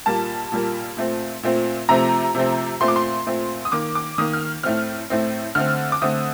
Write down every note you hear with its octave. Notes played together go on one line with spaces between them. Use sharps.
A#2 G3 A#3 A5
A#2 G3 A#3
A#2 A3 C4
A#2 A3 C4
C3 F3 A3 C4 A#5
C3 F3 A3 C4
A#2 A3 C4 C6
D6
C6
A#2 A3 C4
D#6
D#3 A#3 D6
D6
D#3 A#3 D#6
F6
A2 A3 C4 F6
A2 A3 C4
D3 A3 C4 F6
D6
D3 A3 C4 D#6